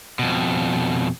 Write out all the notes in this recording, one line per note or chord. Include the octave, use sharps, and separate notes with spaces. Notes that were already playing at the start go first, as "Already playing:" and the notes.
F2 B2